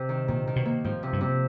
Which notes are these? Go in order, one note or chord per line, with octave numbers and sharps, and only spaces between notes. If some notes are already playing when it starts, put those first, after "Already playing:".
Already playing: C3
D#3
A#2 D#3
D#3
B2
A#3
G#2 F3
C3
G2
C3